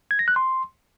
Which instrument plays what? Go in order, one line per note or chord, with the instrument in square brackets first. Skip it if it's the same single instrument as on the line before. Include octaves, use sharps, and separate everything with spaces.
[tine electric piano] G#6
A#6
F#6
C6